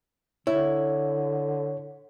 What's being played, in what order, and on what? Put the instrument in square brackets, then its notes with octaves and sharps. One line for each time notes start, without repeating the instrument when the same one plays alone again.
[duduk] D3 [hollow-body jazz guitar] E4 [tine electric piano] C#5